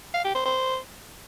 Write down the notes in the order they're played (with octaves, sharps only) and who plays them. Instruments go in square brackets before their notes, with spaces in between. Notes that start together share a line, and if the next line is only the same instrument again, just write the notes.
[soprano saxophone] F5
G4
C5
C5